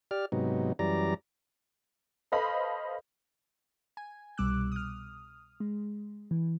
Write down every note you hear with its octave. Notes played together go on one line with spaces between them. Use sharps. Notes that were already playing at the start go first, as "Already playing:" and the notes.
G4 D5 F6
G#2 C3 F#3 B3 D#4
F#2 E3 G3 D5 A#5
A4 B4 C5 D#5 F5 B5
G#5
C2 B2 G3 D6 E6 F#6
D#6 F6
G#3
E3